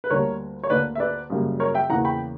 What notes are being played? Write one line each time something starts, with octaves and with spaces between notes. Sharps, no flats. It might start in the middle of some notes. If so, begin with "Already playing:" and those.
B4
D2 D3 G3 A#3 A#4 C#5
C#5
D2 D3 A#3 B4 D5
E5
B4 D5
F#2 C#3 G3 A#3
A#4 C#5
E5 G5
E2 C#3 E3 A#3 F#5 A#5
G5 B5